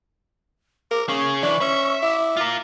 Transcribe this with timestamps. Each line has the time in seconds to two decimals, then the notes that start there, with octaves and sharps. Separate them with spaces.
0.91 A#4 D6
1.08 A#3 C#4 G#4 C#6
1.43 E3 D4 C#6
1.61 C#4 E5
2.02 E4 D6
2.37 F4 A#4